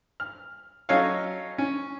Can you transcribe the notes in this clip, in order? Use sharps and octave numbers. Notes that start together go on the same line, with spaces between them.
F6
F#3 C#4 A4 C#5 D#5 F5
C#4